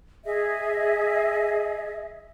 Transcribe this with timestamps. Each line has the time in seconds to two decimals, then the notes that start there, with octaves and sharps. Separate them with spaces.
0.24 G#4 D#5 E5